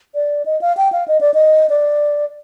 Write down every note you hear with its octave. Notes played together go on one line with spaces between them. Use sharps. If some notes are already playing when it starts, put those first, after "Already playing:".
D5
D#5
F5
G5
F5
D#5
D5
D#5
D5